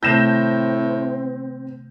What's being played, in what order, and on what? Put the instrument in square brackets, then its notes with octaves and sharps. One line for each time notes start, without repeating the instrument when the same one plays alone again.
[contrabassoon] A2 [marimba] C3 D#3 A3 [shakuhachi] C4 [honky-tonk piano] G6 A#6 E7